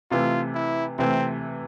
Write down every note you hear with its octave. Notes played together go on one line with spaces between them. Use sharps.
C3 E3 A3 F4
E4
C3 E3 A3 C4